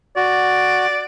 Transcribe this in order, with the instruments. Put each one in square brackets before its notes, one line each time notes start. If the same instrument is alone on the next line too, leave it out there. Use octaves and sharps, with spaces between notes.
[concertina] F#4 [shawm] D5